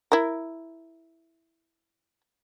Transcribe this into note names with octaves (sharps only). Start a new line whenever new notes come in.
E4 A#4